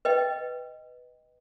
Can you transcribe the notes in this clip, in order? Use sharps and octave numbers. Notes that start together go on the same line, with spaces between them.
B4 D#5 G5